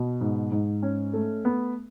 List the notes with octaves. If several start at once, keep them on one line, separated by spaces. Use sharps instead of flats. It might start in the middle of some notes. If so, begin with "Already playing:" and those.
Already playing: B2
G#2
G#2
C#4
A3
B3